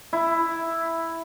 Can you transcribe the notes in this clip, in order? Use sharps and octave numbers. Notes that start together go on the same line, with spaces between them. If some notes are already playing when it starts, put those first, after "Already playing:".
E4